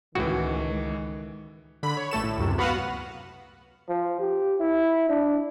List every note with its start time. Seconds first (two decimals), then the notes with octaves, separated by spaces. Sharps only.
0.15 C#2 A2 D#3 E3 F#4
1.83 D3 B5
1.97 C#5
2.11 A1 A3 A4 E7
2.24 A2
2.38 C#2 F#2 C3
2.58 B3 F#4 B4 F5 F#5
3.89 F3
4.19 G4
4.60 E4
5.09 D4